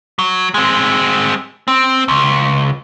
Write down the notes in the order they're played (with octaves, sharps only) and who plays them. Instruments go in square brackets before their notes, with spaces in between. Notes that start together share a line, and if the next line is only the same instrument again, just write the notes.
[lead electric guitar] F#3
G#3 C4
C4
C#2